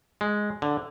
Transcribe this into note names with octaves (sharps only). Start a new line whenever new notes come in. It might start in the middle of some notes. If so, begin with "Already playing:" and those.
G#3
D3